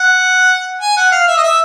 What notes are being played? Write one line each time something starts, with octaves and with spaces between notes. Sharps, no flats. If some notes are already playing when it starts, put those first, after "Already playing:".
Already playing: F#5
G#5
F#5
F5
E5
D#5
E5